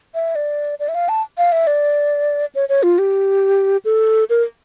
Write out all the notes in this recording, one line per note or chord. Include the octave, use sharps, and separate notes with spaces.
E5
D5
D5
E5
F5
A5
F5
E5
D5
C#5
C#5
F4
G4
A4
A#4